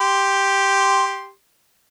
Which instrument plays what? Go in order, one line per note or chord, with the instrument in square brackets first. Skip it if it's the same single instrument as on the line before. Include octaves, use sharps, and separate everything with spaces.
[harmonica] G4 C6